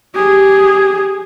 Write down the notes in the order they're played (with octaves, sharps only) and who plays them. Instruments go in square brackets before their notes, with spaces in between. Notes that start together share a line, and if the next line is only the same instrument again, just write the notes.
[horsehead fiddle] G4 G#4